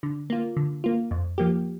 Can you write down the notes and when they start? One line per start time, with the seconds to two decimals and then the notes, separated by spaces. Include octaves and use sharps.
0.03 D3
0.30 A#3 F4
0.57 D3
0.84 A#3 F4
1.11 F2
1.38 F3 A#3 G4